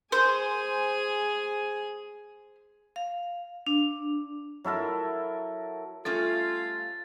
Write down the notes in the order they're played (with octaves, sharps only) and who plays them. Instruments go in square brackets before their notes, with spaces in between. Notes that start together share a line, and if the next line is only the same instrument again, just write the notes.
[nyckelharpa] G#4 G#5 [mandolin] C5
[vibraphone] F5
D4
[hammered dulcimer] F#3 E4 A4 A#4
[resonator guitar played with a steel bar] G3 A3 C#4 [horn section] F4 [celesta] A4 [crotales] A6